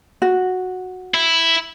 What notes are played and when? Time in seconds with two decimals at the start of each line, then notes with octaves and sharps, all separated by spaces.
0.22 F#4
1.14 E4